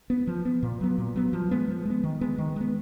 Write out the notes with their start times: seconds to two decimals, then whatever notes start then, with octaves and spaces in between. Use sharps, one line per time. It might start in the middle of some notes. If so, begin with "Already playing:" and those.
0.10 B3
0.27 F3
0.45 B3
0.63 A#2
0.81 F#3 B3
0.98 A#2
1.16 F#3 B3
1.33 F3
1.51 G#3 B3
1.69 F3
1.85 G#3 B3
2.04 D#3
2.21 G#3 B3
2.38 D#3
2.56 G#3 B3